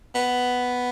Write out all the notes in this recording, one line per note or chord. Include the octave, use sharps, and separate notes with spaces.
B3